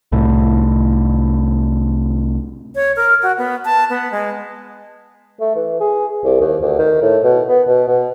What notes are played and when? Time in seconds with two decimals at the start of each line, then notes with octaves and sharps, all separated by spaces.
0.12 C2 A2
2.75 C#5
2.96 A#4
3.23 F#4
3.38 B3
3.65 A5
3.90 B3
4.12 G#3
5.40 A3
5.56 E3
5.80 G#4
6.24 C2
6.41 D#2
6.62 D2
6.79 D#3
7.02 A2
7.24 B2
7.49 B3
7.67 B2
7.88 B2